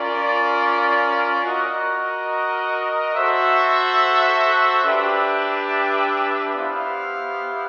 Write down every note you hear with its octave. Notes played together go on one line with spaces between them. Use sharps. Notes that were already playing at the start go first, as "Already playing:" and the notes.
Already playing: C#4 F4 A#4 D5
F#4 A#4 D#5
F#4 A4 C5 E5
D4 G4 B4 E5 G5
B3 E4 G4 C5 F5